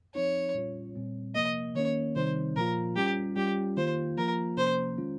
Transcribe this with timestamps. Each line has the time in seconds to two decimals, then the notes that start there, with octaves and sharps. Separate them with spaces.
0.15 F3 C4 D#4 C#5
0.55 A#2 G3 C#4 F4
0.95 A#2 G3 C4
1.35 C3 F3 A#3 D#5
1.75 D#3 A#3 C#4 C#5
2.16 C3 D#3 G3 C4 D#4 C5
2.56 A#2 F3 A#3 F4 A#4
2.96 G3 C#4 F4 G4
3.36 G3 C#4 F4 G4
3.77 D#3 A#3 F4 C5
4.17 F3 A#3 F4 A#4
4.57 C3 F3 A#3 C#4 C5
4.97 D#3 G#3 C#4 F4